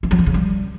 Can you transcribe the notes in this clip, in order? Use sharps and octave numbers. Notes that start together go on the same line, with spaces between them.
E3
F#3
E3
C#3
G3